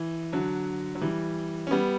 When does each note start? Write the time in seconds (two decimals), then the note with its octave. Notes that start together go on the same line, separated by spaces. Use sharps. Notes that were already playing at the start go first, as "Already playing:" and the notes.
Already playing: E3
0.32 D3 F#3
0.95 F#3
1.01 E3 G3
1.67 C#4
1.71 G3 B3